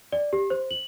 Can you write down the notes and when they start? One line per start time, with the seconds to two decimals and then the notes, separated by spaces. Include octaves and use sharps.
0.12 D5
0.33 G4
0.50 C5
0.71 F#7